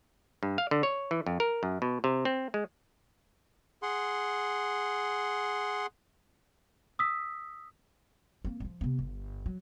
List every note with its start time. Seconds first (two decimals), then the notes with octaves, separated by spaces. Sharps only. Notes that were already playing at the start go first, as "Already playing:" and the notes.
0.43 G2
0.58 F5
0.71 D3
0.83 C#5
1.11 E3
1.27 F2
1.40 A#4
1.63 F#2
1.82 B2
2.04 C3
2.25 C4
2.54 G#3
3.83 G#4 F#5 C6
6.99 D#6 E6 B6
8.45 A#3 C4
8.60 F3 G3
8.81 C3 B3
8.99 G1
9.46 F#3